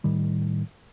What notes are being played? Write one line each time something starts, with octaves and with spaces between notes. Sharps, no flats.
A2 D#3 G3